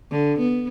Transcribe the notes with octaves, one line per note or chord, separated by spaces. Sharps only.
D3
B3